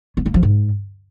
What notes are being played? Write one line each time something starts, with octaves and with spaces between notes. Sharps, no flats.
B3
A#3
F3
G#2